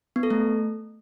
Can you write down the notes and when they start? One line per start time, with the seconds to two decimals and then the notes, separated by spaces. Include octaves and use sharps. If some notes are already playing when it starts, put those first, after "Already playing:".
0.16 B3
0.23 A4
0.31 A3